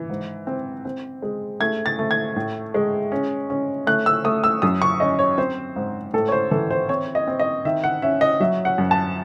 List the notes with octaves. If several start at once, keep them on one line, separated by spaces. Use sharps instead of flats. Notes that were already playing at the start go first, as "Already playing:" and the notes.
Already playing: E3
G#2
C4
C4
G#3
A3 G#6
A6
A3
G#6
A2
G#3
C#4
C#4
A3 F#6
E6
A3 D#6
E6
F#2 D#6
C#6
C#4 D#5
C#5
C4 C5
G#2
A2 A4
C#5
C5
E3 A4
C5
C4 C#5
D#5
C4
D#5
D#3 E5
F#5
C#4 E5
D#5
F#3 E5
F#5
F#2
A5